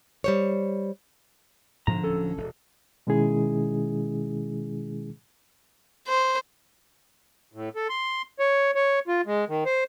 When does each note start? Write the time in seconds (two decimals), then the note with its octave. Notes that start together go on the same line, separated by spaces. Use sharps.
0.24 G3 C5 C#5
1.87 G#2 B2 D3 F3 A#5
2.04 D1 C#4 A4
2.37 E1
3.07 B2 D#3 G#3 C#4 E4 G#4
6.07 C5
7.54 A2
7.76 A4
7.89 C6
8.39 C#5
8.75 C#5
9.08 F4
9.26 G#3
9.49 D#3
9.65 C5